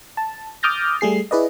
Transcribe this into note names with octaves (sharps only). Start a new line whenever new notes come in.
A5
D6 D#6 F6 G6 A6 A#6
G3 A3 G#4 C7
E4 G#4 B4 D5 D#5